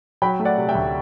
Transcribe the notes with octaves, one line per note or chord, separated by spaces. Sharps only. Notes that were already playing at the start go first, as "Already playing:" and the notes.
F#3 G5 B5
A3
D5 F#5
C3
E5 G5
D2